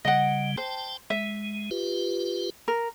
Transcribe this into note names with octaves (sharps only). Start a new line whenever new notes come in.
C#3 G3 D#5 F#5
C5 G5 A5
G#3 E5
F4 G4 B4
A#4